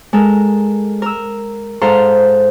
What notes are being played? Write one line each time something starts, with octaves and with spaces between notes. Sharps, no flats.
G#3 A4 A#4
A#4 E6
G#2 A4 C5 F5 A#5 C6